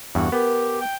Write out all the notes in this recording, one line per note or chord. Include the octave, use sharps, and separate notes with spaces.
E2 G2 F#4
B3 G4 A#4
G5